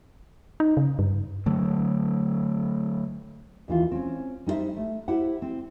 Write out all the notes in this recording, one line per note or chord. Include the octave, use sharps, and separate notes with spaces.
D#4
C#3
G2
D3 F#3 A3
D#2 E3 F4
C4 C#4
G3 D#4 F#4 C5 E5
A3
E4 G4 C5 F#5
C4